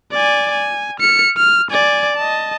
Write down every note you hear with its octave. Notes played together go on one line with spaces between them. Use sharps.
D5 G#5
G#5
F6 C#7
F6
D5 G#5
D#5 A5